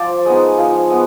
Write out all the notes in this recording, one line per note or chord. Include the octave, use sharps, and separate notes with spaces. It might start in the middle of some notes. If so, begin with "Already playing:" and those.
Already playing: F3 C5 D5
G#3 B3 D#4
F3
G#3 B3